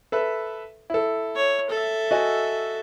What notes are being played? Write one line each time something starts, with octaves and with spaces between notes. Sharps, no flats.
A4 B4 E5
E4 A4
C#5
A4 E5
F#4 D#5 G#5